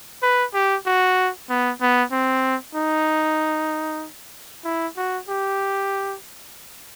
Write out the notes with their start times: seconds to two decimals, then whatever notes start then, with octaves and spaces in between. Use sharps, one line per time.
0.23 B4
0.54 G4
0.86 F#4
1.50 B3
1.81 B3
2.12 C4
2.75 D#4
4.65 E4
4.97 F#4
5.28 G4